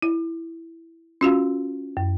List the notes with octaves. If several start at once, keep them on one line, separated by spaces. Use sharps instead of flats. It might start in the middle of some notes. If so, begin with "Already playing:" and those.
E4
C#4 F4 F#4 F5
F#2